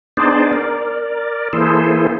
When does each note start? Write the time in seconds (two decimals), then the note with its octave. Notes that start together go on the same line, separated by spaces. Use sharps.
0.17 B3 D4 D#4 G#4 C5 D5
0.53 A#4 D5
1.53 E3 A#3 E4 G#4 A4 C5